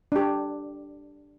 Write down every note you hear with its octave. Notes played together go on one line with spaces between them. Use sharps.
D4 G4